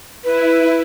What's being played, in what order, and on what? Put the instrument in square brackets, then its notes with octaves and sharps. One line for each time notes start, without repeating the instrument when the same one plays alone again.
[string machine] E4 [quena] B4